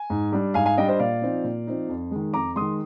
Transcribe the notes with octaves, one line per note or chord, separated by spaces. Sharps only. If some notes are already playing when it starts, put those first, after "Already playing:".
Already playing: G#5
G#2
G3 D4
G#2 F5 G#5
F5 G#5
G3 D4 D#5 G5
C5 D#5
A#2 D5 F5
F3 C4 D#4
A#2
F3 C4 D#4
F2
D#3 G#3
F2 A#5 D6
D#3 G#3 C6 D#6